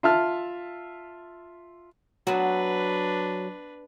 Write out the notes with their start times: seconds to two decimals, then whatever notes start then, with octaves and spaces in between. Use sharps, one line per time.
0.03 F4 E5 A5 F6
2.27 F#3 B3 D4 F#4 B4